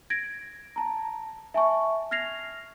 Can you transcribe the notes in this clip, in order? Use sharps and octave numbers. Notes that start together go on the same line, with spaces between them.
G#6 A#6 D7
A5 A#5
E5 G#5 A5 C#6
F6 G#6 A#6 C7 F7